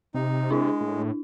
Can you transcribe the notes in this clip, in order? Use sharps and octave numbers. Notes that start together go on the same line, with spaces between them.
C3 D#4
G#3 D4 E4
A2